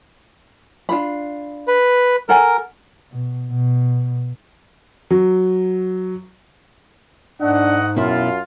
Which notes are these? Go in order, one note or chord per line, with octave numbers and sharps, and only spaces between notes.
D4 F4 B5
B4
A4 A#4 F#5 G#5
B2
B2
F#3
G#2 A3 D4 D#5 F#5
F#2 B2 E4 F4